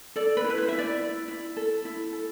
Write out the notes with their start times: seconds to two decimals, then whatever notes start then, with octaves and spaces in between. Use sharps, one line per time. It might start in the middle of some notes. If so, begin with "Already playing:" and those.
0.16 A4 D5
0.37 B4
0.44 E4
0.50 B4
0.58 C5
0.68 E4 E5
0.79 D5
1.00 E4
1.28 E4
1.57 A4
1.85 E4
2.13 A4